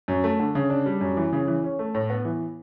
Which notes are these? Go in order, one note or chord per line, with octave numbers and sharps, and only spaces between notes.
F#2
A3
D3
C#3
D4
G3
F#2
E3
C#3
E3
C#4
A3
A2
B3
E3